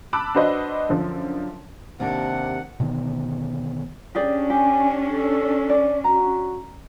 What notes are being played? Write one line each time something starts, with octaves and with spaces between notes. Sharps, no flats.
A5 B5 D6 E6 F#6
D4 F#4 B4 C5 D#5
F#2 D3 F3
D#2 C3 A#3 D4 F#5
B2 D3 D#3 B3
C#4 D4 G4 G#4 D5
G4 G#5
A4
D5
F#4 A#5